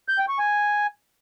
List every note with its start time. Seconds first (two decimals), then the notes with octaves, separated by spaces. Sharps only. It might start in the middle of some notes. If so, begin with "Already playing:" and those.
0.09 G6
0.19 G5
0.29 C#6
0.39 G#5